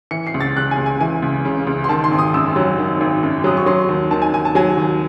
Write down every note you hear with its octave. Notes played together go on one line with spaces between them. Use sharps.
E3 C#7
C7
C#2
A6
C#3 F#6
G#5
C#2
G#5
E3 G#5
C#2
C#3
C#2
C6
D#3 A5
C6
G#1
D#6
F#2 E6
F#3
D#3
G#1
F#2
F#3 D#6
C#6
F#3 C6
D#2
D#3 A5
G#5
D#2 G#5
A5
F#3 G#5
D#2